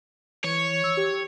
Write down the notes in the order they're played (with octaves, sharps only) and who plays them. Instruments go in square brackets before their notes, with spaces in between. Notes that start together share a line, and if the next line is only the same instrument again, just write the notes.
[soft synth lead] E3 [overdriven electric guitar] C#5
[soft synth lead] E6
G4